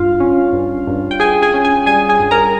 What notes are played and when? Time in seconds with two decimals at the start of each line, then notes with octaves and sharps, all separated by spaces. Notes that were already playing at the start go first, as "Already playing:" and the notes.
Already playing: G2 F4 F5
0.20 C#4
0.53 G2
0.87 G2
1.11 G5
1.20 G2 G#4 G#5
1.42 G#4 G#5
1.54 C#4
1.65 G#4 G#5
1.86 G3 G#4 G#5
2.09 G#4 G#5
2.20 G2
2.31 A#4 A#5